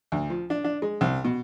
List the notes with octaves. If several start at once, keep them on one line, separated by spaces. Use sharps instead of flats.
D2
F3
D4
D4
G#3
C2
B2